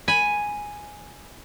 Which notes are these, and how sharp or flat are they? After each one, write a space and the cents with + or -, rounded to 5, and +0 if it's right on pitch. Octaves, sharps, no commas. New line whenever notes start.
G#5 +0 B5 +0